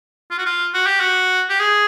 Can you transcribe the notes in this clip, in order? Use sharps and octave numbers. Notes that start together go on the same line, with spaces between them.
F4
F#4
F4
F#4
G4
F#4
G4
G#4